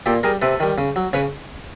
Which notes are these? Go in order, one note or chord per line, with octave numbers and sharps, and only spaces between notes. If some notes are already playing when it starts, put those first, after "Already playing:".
A#2 G4 A4
G3 G#4 A#4
C3 A4 B4
D#3 G3
C#3
F#3
C#3 B4 C#5